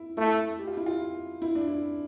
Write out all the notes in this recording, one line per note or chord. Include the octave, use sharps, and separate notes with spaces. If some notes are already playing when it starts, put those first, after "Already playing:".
Already playing: E4
A3 E4
G4
F4
E4
F4
E4
D4
E4